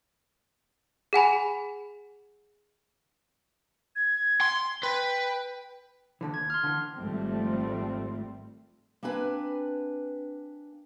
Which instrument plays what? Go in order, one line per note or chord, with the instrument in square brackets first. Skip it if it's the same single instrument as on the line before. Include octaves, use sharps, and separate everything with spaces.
[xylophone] G#4 F#5 G#5 B5
[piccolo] G#6
[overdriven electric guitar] C6
[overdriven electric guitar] B4 [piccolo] G5
[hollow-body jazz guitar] D#2 D3 E3
[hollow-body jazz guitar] D#2 [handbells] G#6
[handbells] C6 F6
[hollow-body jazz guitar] D3 E3
[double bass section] G#1 F3 G3 A3 C4
[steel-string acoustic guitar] A#3 C4 D4 B4 G#5